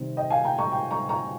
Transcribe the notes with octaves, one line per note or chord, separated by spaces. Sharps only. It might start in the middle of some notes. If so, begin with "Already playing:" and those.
Already playing: C3 D#3 G3 C4 D#4
D#5 G5
F5 G#5
G5 A#5
A#5 C#6
G5 A#5
A#5 C#6
A#5 C#6